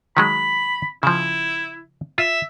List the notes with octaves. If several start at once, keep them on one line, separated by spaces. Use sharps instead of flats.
D#3 F#3 G#3 B5
C#3 F3 E4
F4 E5